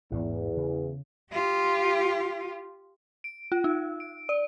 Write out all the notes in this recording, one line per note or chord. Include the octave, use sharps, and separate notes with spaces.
A1 E2 G#2 B3
C#3
F4 G4
D7
F4
D#4
D7
D5